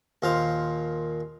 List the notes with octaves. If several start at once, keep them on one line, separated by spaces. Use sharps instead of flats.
D#2 A#2 C5 F5